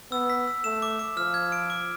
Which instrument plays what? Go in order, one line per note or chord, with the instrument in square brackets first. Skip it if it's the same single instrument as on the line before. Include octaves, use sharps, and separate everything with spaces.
[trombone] B3 [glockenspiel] E6
[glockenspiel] B6
E6
[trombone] A3 [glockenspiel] E7
[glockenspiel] D6
D6
[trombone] F3 [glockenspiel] F6
[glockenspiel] G#6
D7
D6